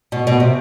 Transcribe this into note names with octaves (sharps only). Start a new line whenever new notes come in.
B2
B2
C3